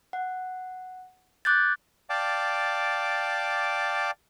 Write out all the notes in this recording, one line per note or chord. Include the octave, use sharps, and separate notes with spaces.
F#5
D6 F#6 G6 A6
D5 F5 G5 A5 D6